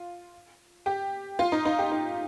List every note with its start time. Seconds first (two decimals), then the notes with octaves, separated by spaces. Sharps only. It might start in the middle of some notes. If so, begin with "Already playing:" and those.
Already playing: F4
0.86 G4
1.39 F4
1.52 D#4
1.65 D#4
1.79 G4
1.92 D#4